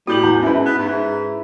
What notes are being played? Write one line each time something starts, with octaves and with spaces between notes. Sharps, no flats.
A2 G3 F#4 G6 F#7
E2
G#2 C#4 E4 B4
B3
G#2